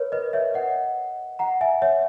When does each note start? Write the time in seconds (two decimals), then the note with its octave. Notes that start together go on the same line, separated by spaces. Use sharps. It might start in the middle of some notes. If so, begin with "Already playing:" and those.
Already playing: A#4 B4 C#5
0.12 B4 D#5
0.33 C#5 E5
0.54 D#5 F#5
1.39 F#5 A#5
1.61 E5 G#5
1.82 C#5 E5